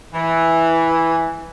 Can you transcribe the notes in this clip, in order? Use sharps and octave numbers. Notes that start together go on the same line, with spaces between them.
E3